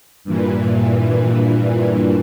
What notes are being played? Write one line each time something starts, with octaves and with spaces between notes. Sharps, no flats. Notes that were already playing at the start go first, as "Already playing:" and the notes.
G2 A#2 E3